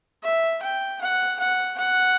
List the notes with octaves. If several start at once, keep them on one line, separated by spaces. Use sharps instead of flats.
E5
G5
F#5
F#5
F#5